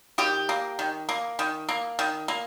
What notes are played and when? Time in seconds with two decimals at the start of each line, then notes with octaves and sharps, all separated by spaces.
0.18 D#3 G4
0.49 A#3
0.79 D#3
1.09 A#3
1.39 D#3
1.69 A#3
1.99 D#3
2.28 A#3